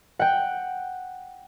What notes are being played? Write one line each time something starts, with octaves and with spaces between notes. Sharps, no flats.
F#5 G5